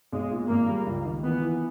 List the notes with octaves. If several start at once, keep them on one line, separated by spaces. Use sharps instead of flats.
B1 G#3
A#2
G#1 A#3
G3
C#2
D#3
E3 B3
E3